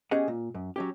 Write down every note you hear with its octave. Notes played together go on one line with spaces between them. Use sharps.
B3 C#4 G4 G#4 D#5 F#5
A#2
F#2
F#3 C#4 G4